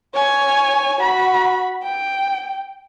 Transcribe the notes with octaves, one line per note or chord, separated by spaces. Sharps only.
C#5 G#5
F#4 B5
G5